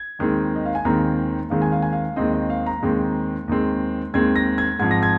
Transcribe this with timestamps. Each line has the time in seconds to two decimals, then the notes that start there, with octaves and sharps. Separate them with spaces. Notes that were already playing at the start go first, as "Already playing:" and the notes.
Already playing: G#6
0.19 D#2 D#3 G#3 C4
0.55 D#5
0.65 F5
0.75 G#5
0.85 D#2 D#3 G#3 C4 A#5
1.50 D#2 D#3 G#3 C4 F5
1.62 G#5
1.72 F5
1.82 G#5
1.93 F5
2.16 D#2 D#3 G#3 C4 D#5
2.33 D#5
2.50 F5
2.66 A#5
2.83 D#2 D#3 G#3 C4
3.48 D#2 D#3 G#3 C4
4.14 D#2 D#3 G#3 C4 G#6
4.36 A#6
4.58 G#6
4.80 G#2 F3 C4 G#6
4.91 A#6
5.03 G#6